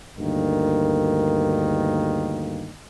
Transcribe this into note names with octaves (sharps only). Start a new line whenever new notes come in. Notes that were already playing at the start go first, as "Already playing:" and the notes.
D2 G2 D#3 A#3